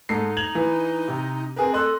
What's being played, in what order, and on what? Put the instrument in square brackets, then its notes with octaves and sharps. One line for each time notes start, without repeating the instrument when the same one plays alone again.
[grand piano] G#2 A4 C7 [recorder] D#4
[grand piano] G#6 F7 F#7
E3
C3
[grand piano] C4 G#4 A#4 [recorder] B4
[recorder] A4 [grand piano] D#5 C6 F#6